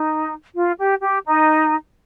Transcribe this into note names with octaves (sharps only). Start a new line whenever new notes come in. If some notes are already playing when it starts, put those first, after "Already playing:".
Already playing: D#4
F4
G4
G4
D#4